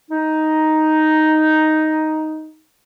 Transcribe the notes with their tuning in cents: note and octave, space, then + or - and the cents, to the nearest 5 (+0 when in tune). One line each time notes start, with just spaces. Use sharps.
D#4 +5